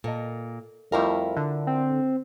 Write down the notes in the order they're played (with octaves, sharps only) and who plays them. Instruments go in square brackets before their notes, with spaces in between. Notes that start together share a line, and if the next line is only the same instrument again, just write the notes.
[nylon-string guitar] A#2 [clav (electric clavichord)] A4 A#4 D#5
[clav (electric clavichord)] F2 G3 A3 [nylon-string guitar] E4 F4 A#4
[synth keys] D3 [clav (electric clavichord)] D4
[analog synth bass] C4